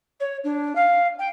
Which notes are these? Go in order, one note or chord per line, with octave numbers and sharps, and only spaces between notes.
C#5
D4
F5
G5